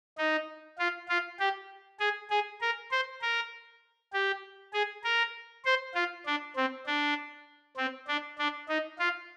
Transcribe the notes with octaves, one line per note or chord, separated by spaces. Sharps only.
D#4
F4
F4
G4
G#4
G#4
A#4
C5
A#4
G4
G#4
A#4
C5
F4
D4
C4
D4
C4
D4
D4
D#4
F4